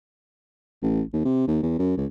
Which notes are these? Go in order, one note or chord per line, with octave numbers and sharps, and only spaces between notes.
A1
D#2
C3
D#2
E2
F#2
C#2